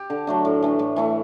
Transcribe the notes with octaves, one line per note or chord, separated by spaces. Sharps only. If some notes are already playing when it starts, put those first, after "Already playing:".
Already playing: G4
D3
F#3 A3 D4
A2
E3 A3 D4
A2
E3 A3 E4